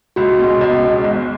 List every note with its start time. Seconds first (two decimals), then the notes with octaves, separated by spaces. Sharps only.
0.16 C#2 F#4
0.39 B2 G#3
0.61 C#2
0.83 B2 G#3
1.04 G#1